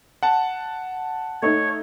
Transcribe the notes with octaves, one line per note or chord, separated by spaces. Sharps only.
F#5 A5
A3 D#4 C#5